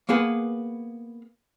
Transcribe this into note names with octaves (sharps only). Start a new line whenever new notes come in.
A#3 B3 G#4 B4